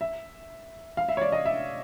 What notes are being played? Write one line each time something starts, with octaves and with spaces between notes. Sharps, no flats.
E5
F5
E5
C#5
D5
D#5
E5